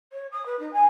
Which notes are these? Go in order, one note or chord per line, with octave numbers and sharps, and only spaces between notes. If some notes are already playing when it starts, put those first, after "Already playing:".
C#5
D#6
B4
D#4
G#5